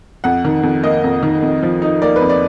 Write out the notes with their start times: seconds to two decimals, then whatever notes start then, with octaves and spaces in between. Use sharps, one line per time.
0.24 F2 F#5
0.45 D#3
0.63 F2
0.83 A#3 D#5
1.04 F2
1.23 D#3
1.42 F2
1.63 F3
1.82 D#4
2.02 A#3 D5
2.16 B4
2.22 F2
2.29 D5